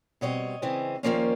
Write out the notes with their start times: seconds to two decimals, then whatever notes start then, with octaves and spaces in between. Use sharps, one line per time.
0.21 B2 G3 C4 C#5 D#5
0.62 C#3 E3 G#3 C4
1.03 D#2 C#3 F3 A#3 C#4 C5 D5